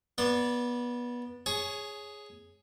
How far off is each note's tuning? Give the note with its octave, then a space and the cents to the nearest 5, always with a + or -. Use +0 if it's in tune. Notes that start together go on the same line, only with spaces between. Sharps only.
B3 -20 D5 +0 C6 +10
G#4 +0 C#5 +0 G#5 +20